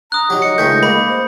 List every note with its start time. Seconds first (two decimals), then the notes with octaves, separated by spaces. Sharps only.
0.12 A#5 D#6 F#6
0.30 F#3 D#4 G4
0.42 D#5 C#7
0.58 C#2 D#3 A3 G6
0.83 A#3 B5
1.09 C5